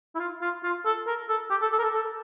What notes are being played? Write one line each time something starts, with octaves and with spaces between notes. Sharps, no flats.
E4
F4
F4
F4
A4
A#4
A4
G4
A4
A4
A#4
A4
A4